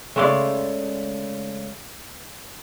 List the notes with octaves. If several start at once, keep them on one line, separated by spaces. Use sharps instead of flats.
C#3 G#3 A3 D5 D#5 C6